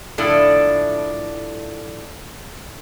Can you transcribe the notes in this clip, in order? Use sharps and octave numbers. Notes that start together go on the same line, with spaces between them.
A2 D3 F3 D4 E4 A4